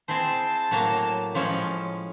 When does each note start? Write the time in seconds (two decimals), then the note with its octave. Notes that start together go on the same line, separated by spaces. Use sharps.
0.08 C4 E4 G#4 C5 A5
0.71 A2 F#3 A#3
1.35 A2 F3 G#3 C#4